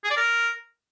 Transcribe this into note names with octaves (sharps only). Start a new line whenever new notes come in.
G#4
D5
A#4